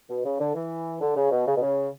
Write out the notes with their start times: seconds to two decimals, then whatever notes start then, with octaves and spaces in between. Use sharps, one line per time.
0.10 B2
0.25 C#3
0.40 D3
0.55 E3
1.01 D3
1.16 C#3
1.31 B2
1.47 C#3
1.56 B2
1.62 C#3